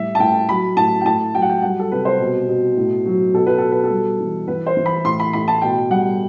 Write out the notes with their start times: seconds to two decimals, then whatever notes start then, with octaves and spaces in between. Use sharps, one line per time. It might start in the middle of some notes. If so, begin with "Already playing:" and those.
Already playing: A2 G3 E5
0.15 A5
0.20 A2 G5
0.49 F#3 B5
0.76 A2 A5
1.01 G5
1.05 A2 A5
1.34 F#3 G5
1.42 F#5
1.50 G5
1.62 G3 F#5
1.79 A4
1.92 C3 B4
2.05 C5
2.20 B2
2.48 B2
2.77 A2
3.06 F#3
3.34 B2 A4
3.46 B4
3.58 B2 A4
3.72 B4
3.84 A4
3.90 G3
4.20 E3
4.48 E3 B4
4.67 C5
4.77 E3
4.86 B5
5.04 A2 C6
5.20 B5
5.33 A2 B5
5.48 A5
5.62 B2 G5
5.90 G3 F#5